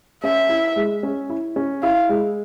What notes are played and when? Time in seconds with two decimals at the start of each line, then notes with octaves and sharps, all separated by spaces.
0.23 C#4 E5
0.49 E4
0.76 G#3
1.03 C#4
1.30 E4
1.56 C#4
1.82 E4 F5
2.09 G#3